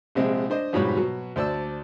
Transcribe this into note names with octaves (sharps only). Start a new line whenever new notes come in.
A#1 C3 G#3 C4
D4 C5 D#5
F2 G#2 B2 G3 C#5 B5
B2 F#3
D2 C5 D5 A5 E6